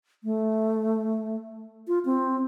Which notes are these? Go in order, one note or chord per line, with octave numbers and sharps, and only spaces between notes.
A3
F4
C4